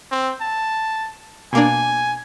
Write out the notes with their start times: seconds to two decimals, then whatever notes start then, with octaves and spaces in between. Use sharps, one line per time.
0.11 C4
0.41 A5
1.53 B2 A#3 D4 G#5